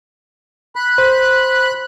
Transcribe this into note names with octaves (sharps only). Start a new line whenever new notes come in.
B5 F#6
C5